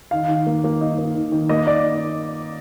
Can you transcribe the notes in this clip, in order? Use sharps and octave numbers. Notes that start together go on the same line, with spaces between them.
D#3 F5
D#3
A#3
A#3
D#4
A#3
D#3
D#3
A#3 D#5
D#4 D5